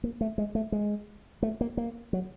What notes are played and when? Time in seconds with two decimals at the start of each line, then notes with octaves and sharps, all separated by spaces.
0.04 A#3
0.21 A3
0.38 G#3
0.55 A3
0.72 G#3
1.43 A3
1.61 A#3
1.77 A#3
2.13 F#3